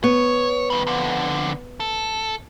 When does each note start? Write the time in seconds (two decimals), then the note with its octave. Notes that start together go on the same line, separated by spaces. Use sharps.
0.04 B3 C#5
0.70 D#3 G3
0.87 F2 D3
1.80 A4